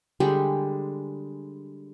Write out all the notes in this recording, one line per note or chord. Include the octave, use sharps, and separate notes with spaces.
D3 G3 G#3 G4